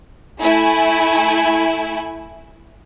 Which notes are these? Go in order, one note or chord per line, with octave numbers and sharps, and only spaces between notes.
A3 E4 G#5